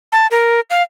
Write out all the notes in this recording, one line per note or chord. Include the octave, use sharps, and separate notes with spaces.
A5
A#4
F5